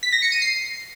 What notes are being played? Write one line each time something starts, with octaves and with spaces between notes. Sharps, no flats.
B6
A#6
C#7
D#7
C7